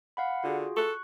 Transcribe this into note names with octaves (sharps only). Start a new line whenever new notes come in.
F5 F#5 B5
D3 F4 F#4 G#4
A4 C#6 F#6